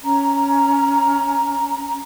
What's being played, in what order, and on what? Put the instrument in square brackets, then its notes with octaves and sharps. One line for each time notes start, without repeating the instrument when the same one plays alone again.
[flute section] C#4 A#5